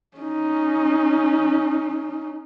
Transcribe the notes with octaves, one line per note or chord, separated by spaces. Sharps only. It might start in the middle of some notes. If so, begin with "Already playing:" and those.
C#4 D#4